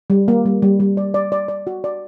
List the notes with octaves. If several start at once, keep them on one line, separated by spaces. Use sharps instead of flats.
G3
A#3
G3
G3
G3
D5
D5
D5
D5
F#4
D5